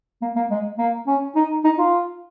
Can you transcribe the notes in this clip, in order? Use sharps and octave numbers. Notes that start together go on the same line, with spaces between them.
A#3
A#3
G#3
A#3
C#4
D#4
D#4
F4